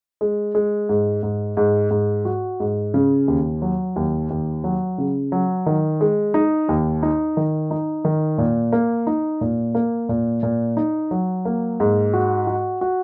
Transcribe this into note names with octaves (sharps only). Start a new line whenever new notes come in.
G#3
G#3
G#2
G#2
G#2
G#2
F#4
G#2
C#3
D#2
F#3
D#2
D#2
F#3
C#3
F#3
D#3
G#3
D#4
D#2
D#4
D#3
D#4
D#3
A#2
A#3
D#4
A#2
A#3
A#2
A#2
D#4
F#3
A#3
G#2
F#4
F#4
F#4